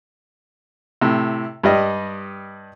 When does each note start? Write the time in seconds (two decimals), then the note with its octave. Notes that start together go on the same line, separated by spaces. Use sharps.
1.01 A2 C3
1.63 G2 G3 D#5